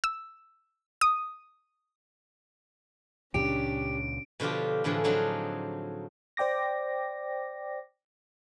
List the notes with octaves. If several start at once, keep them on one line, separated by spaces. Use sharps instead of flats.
E6
D#6
C#2 A#2 C#3 C#4 D4 G4 D7
B2 D3 F3 F4 G4
A2 D3 E3 F3 G#4
D3 F3 F#3 C4 D4 D#4
C5 D5 G5 D6 A#6